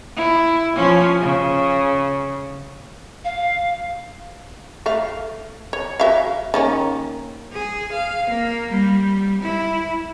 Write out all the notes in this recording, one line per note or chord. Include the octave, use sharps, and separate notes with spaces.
E4
F3 C#4
C#3
F5
A3 E5 F5
C#5
F#4 E5 F5
D#3 A#3 C#4
G#4
F5
A#3
G3
E4